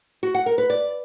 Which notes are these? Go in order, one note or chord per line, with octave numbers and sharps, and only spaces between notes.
F#4
F#5
A#4
B4
D5